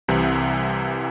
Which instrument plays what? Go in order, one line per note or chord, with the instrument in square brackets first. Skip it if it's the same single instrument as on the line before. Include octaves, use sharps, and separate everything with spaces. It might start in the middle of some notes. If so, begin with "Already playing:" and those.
[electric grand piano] C2 C3 E3